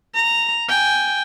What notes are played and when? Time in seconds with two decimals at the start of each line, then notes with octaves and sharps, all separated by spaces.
0.15 A#5
0.69 G5 G#5